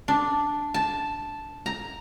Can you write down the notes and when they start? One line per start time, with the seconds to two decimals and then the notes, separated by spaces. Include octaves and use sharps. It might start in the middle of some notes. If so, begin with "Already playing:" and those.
0.08 D4
0.74 A5
1.66 A#5